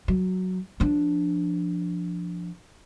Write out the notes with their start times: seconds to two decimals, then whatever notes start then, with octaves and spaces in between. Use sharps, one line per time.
0.08 F#3
0.80 F3 D4